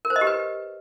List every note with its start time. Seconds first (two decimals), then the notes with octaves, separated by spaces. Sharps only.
0.05 A#4
0.10 C5
0.16 D#5
0.21 G4
0.27 B4